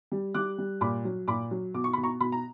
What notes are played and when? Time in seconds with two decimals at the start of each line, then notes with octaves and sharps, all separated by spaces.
0.12 G3
0.34 G3 D6 F#6
0.58 G3
0.81 A#2 B5 D6
1.05 F#3
1.28 A#2 B5 D6
1.51 F#3
1.74 B2 D6
1.84 C#6
1.93 B2 B5
2.03 A#5 C#6
2.20 B2 B5
2.32 A#5